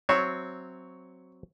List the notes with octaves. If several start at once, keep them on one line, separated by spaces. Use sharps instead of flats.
F#3 C4 C#5 E5